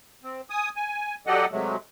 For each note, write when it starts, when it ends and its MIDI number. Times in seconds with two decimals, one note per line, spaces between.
0.23 0.41 60
0.50 0.69 80
0.50 0.69 87
0.76 1.15 80
1.27 1.46 54
1.27 1.46 67
1.27 1.46 69
1.27 1.46 74
1.27 1.46 75
1.27 1.46 78
1.52 1.76 48
1.52 1.76 54
1.52 1.76 56
1.52 1.76 57